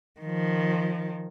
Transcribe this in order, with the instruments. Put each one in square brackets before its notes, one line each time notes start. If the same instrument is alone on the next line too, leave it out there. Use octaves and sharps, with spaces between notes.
[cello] D#3 F3